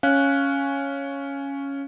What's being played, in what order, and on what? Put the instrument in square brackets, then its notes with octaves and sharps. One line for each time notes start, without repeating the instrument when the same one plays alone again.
[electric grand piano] C#4 [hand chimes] F5 F#6